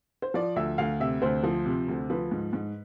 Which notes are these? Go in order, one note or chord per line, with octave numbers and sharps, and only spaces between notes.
C5
F3 D5
D2 E5
D2 F5
C3 E5
D2 C5
F3
C3
D2
F3 B4
G#2
G#2